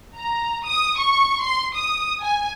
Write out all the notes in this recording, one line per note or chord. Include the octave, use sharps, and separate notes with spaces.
A#5
D#6
C#6
C6
D#6
G#5